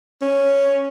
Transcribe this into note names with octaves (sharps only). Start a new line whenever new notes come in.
C#4